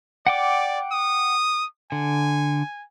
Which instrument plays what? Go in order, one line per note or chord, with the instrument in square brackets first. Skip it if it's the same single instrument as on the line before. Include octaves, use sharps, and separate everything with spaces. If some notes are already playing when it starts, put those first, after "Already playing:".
[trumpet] D5 [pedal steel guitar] F#5 G5 D6
[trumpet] D#6
[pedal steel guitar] D3 [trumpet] G#5